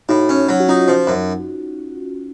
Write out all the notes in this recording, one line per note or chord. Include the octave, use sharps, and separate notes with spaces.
A2 D#4 F#4
C#4
F#3
F#4
C#4 D#4 F4
F3
F#2